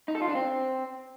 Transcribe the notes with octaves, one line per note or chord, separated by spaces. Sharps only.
D#4
A4
F4
D4
C4